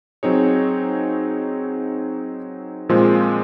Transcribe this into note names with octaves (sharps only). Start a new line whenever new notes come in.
F#3 C4 D#4 G#4 C#5
A#2 F3 G#3 C4 F4